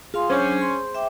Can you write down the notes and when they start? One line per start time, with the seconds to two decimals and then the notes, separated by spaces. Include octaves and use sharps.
0.14 F4 G#4 F5 C6
0.30 F#3 C#4 D4 C5 G#5
0.61 C6
0.95 E5 G5 D6